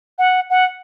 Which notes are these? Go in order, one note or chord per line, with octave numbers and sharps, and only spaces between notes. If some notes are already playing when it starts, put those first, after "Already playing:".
F#5
F#5